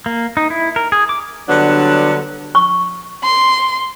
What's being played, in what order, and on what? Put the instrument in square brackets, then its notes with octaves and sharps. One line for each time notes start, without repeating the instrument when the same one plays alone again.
[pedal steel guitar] A#3
D#4
E4
A#4
G#4
D6
[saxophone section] D3 F#3 G3 B3 D4
[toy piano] C#6
[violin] C6